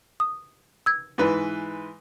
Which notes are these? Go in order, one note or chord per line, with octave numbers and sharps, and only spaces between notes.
D#6
E6 G#6
G#2 E3 B4